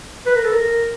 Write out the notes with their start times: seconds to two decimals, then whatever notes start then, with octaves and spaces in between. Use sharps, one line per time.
0.26 B4
0.35 A#4
0.44 A4
0.53 A#4